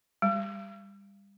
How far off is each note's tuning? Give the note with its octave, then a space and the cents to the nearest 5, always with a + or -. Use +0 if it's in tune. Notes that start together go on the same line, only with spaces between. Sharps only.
G3 +25